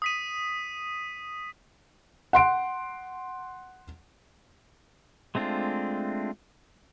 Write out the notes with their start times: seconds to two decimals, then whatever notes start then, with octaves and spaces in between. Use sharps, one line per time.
0.02 D#6 B6 D#7
2.33 F#5 C6 D7
5.35 G#3 A3 C4 D4 F4